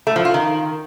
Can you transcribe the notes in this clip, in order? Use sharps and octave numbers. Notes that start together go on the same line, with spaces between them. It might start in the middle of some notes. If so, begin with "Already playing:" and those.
A3
F3
F4
D#3